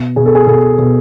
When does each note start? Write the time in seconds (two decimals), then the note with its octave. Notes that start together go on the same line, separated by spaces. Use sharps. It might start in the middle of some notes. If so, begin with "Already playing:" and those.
Already playing: B2
0.16 B2 G#4
0.26 A4
0.35 G#4
0.47 B2 A4
0.78 B2